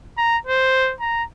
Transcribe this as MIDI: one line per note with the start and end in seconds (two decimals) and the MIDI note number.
0.18 0.37 82
0.47 0.93 72
1.00 1.24 82